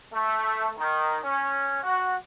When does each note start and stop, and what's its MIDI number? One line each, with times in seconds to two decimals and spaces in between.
0.12 0.72 57
0.78 1.18 51
1.23 1.82 61
1.83 2.15 66